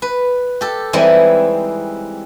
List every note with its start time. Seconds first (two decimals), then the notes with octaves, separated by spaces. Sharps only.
0.02 B4
0.61 G4 A4
0.93 E3 G3 G#3 C4 D#4 E4